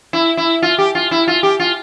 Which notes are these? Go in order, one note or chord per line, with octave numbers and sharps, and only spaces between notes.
E4
E4
F4
G4
F4
E4
F4
G4
F4